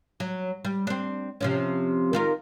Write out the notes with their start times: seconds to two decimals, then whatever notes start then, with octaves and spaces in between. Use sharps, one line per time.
0.20 F#3
0.65 G3
0.87 C4 D4
1.41 C3 F3 C#4
2.13 D#3 F4 A#4